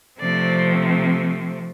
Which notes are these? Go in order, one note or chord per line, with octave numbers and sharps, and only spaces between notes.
C3 F3 A3 C4 D5